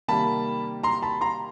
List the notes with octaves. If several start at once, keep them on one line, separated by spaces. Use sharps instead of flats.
C3 D#3 G3 A#3 A5 B5
A#5 C6
A5 B5
A#5 C6